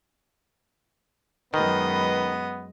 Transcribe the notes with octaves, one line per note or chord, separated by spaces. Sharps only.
F#2 D#3 G#3 B3 B4 D#5